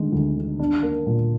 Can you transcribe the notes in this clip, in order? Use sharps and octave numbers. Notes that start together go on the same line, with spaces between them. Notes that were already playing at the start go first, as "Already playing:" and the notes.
Already playing: D3 D#3 G#3 D#4
D2
D3
D4
A#3
A#2